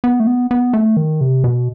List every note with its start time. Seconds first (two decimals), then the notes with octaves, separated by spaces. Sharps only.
0.04 B3
0.20 A3
0.27 B3
0.51 B3
0.73 A3
0.97 D#3
1.21 C3
1.44 B2